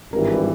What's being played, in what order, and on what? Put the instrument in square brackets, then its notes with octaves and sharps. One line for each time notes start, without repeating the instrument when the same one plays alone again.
[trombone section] G#1 G2 E3 G3 [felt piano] A#4